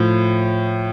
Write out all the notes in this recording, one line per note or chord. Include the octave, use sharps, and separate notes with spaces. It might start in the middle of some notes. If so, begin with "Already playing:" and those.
Already playing: A2 F3